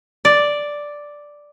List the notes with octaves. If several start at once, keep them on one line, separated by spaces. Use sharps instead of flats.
D5